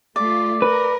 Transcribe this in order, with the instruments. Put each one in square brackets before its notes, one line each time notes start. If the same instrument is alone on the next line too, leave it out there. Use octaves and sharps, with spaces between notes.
[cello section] A3 F4 [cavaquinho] D5
[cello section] A#4 [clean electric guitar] B4